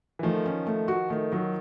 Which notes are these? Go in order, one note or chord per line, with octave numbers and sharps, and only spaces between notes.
E3
D#3 F3 A3
C#4
A3
F#4
D#3 A3
D#3 F#3